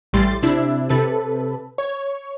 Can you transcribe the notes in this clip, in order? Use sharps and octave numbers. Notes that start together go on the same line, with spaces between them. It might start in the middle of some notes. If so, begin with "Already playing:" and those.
A1 A2 G3 C6 A6
C3 D4 E4
C3 A4 B4
C#5